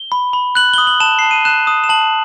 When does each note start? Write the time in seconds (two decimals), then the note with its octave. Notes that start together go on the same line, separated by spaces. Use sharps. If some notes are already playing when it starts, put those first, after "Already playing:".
Already playing: G7
0.12 B5
0.33 B5
0.55 F#6 F#7
0.74 D#6 G7
0.87 F#7
1.00 A5 E7
1.19 A5 C7
1.31 D#7
1.45 F#6 E7
1.67 D#6
1.84 E7
1.89 A5 F#7